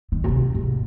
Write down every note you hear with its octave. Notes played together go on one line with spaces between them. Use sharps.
D#3
A#2
C3
G#2